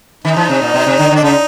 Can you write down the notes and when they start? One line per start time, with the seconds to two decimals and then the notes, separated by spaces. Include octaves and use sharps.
0.24 D#3 D#4
0.37 E3
0.49 C3
0.62 A#2
0.74 B2
0.87 C3
0.99 D3
1.11 D3 D4
1.23 C#3 D#4